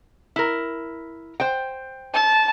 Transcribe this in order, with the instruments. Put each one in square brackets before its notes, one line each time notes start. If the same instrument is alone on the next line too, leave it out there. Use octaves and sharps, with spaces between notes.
[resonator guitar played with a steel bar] E4 A#4
C5 G5
[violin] A5